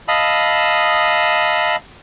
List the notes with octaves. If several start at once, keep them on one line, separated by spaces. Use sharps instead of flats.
D#5 F5 A5 B5 D#6 E6